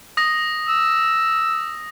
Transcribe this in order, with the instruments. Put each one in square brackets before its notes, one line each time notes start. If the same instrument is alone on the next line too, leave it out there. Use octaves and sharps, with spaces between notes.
[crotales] D#6 A#6
[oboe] E6